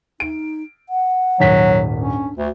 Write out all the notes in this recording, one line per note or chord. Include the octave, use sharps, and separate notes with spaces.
D#4 D7
F#5
D#1 G#1 F#3 B6
C#4 D4
D2 F#4